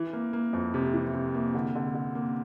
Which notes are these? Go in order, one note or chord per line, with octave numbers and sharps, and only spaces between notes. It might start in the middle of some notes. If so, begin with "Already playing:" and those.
Already playing: E3
A#3
A#3
F2
C3
E3
C3
A#3
D3
D3
D3
A#3